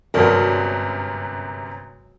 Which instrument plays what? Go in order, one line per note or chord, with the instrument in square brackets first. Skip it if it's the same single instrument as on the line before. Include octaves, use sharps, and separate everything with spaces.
[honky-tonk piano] G1 F#2 C3 [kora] F#3 G#3 D4 [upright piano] A#4